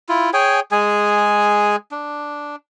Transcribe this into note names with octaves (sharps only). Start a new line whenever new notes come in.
E4 F4
G#4 C#5 G5 G#5
G#3 G#4 G#5
D4